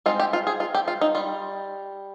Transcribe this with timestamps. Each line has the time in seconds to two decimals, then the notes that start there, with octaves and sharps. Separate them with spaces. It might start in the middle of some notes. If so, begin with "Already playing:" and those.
0.06 G#3 C4 D#4 F4
0.20 G4
0.33 F4
0.47 G#4
0.60 F4
0.75 G4
0.88 F4
1.01 D#4
1.15 G3 F4